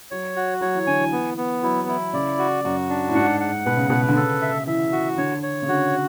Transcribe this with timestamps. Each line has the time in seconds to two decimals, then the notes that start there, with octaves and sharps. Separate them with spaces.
0.11 F#3 C#5
0.36 F#4
0.61 F#3 C#5
0.75 E3
0.87 D3 G#5
1.00 E3
1.12 B3
1.37 B3
1.63 F#3 E4
1.88 E3 E4
2.13 C#3 D5
2.39 F#4
2.64 F#2 F#4
2.89 D4
3.08 A2
3.15 G#2 F#5
3.40 F#5
3.66 B2 B4
3.77 C#3
3.90 B2 B4
4.08 D3
4.16 C#3 A4
4.42 E5
4.67 E3 E5
4.92 F#4
5.18 D3 C#5
5.43 C#5
5.62 C#3
5.68 D3 F#4